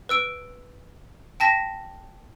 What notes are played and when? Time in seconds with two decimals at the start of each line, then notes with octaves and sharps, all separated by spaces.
0.09 B4 E6 D7
1.40 G5 A5 A#6 B6